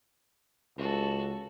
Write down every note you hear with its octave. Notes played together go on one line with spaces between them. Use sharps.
C#2 F#4 A4